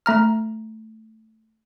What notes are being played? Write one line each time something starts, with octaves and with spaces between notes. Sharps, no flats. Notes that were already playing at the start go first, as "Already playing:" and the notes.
A3 A#5 F6